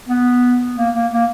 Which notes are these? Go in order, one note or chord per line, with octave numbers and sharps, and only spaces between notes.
B3
A#3
A#3
A#3